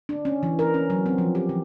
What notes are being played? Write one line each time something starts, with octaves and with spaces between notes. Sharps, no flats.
D4
C#4
E3
A#4
C#4
F#3
C4
F3
G4
E3